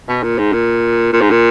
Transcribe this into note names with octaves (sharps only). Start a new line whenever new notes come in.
B2
A#2
G#2
A#2
A#2
G#2
A#2